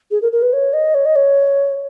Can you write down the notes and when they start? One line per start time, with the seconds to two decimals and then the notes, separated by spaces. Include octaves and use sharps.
0.11 G#4
0.22 A#4
0.32 A#4
0.42 B4
0.53 C#5
0.73 D#5
0.94 C#5
1.05 D#5
1.16 C#5